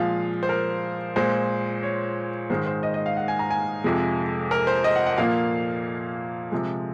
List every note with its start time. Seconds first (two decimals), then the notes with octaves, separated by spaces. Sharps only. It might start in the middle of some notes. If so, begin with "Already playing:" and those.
Already playing: A#2 F3 G#3 F5
0.43 C5
0.49 A#4
1.16 A#2 G#3 C5
1.83 C#5
2.50 G#2 D#3 G#3 C5
2.66 C5
2.83 D#5
2.94 D#5
3.06 F5
3.17 F#5
3.28 G#5
3.39 A#5
3.50 G#5
3.84 F2 C3 F3 G#3
4.51 A#4
4.67 C5
4.84 D#5
4.96 F#5
5.07 F#5
5.18 A#2 F3 A#3 F5
6.51 C3 F3 G#3